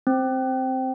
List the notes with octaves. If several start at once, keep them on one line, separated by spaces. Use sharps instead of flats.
C4